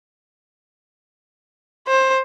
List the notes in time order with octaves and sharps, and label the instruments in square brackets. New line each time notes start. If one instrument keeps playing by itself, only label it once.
[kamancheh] C5